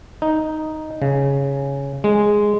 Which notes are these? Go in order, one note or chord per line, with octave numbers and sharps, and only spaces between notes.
D#4
C#3
G#3